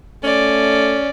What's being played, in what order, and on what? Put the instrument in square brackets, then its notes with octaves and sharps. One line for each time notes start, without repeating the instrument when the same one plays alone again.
[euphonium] A3 [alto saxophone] C#4 [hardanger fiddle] D5